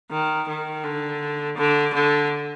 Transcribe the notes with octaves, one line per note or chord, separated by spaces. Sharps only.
D#3
D#3
D3
D3
D3